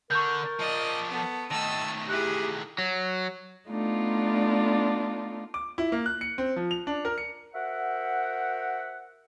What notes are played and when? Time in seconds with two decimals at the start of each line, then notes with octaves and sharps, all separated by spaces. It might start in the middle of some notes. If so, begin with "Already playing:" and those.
0.11 D3 A#4 C#6 G6
0.59 F3 D5 D#5
1.09 B3 A4
1.51 D#3 A3 D#5 A5 E6
2.09 E4 G4 G#4 F#6
2.78 F#3
3.69 A3 B3 D4 D#4 F4
5.54 D6
5.78 E4
5.92 A#3
6.06 F#6
6.21 C#7
6.38 C4
6.56 F3
6.71 F7
6.87 D4
7.05 A#4
7.18 C#7
7.54 F#4 A#4 C5 E5 F#5